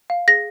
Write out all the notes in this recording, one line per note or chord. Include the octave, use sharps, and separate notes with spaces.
F5
G#4 A#6